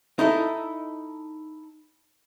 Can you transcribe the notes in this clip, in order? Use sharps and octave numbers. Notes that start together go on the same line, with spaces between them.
D#4 E4 A4